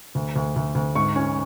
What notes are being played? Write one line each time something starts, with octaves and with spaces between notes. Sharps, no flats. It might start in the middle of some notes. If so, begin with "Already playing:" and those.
D2
D2
D2
D2
G#2 C#6
C#4